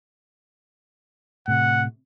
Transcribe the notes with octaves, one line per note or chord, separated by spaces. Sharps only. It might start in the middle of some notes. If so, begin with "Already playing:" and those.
A2 C3 F#5